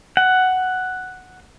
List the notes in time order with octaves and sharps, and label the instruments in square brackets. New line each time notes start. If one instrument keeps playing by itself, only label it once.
[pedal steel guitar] F#5